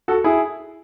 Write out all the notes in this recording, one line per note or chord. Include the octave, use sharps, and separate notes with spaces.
F#4 A4
E4 G#4